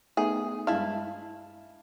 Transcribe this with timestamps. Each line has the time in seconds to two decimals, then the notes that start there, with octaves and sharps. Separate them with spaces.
0.17 A3 B3 D#4 G#4
0.67 G2 G#3 E4 F5 A5